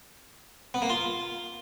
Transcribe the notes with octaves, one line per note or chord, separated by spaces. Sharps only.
B3
A#3
F4